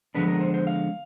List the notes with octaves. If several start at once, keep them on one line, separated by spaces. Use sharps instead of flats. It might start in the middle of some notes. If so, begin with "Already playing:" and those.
D3 F3 G#3 B3 D4 B4
A#4
C5
C5
F5